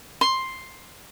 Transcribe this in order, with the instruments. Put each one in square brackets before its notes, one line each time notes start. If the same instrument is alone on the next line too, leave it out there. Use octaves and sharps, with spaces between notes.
[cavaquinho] C6